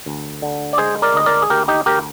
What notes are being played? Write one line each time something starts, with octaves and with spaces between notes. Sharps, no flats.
D2
D3
D5
G#3 G#4 C5
A#4 D5
D2 D#5
A#4 D5
G#4
D2 G4 A#4
D#4 G4
D2 G4 A#4